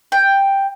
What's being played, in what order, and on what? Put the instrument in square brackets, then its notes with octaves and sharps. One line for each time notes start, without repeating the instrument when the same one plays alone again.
[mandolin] G5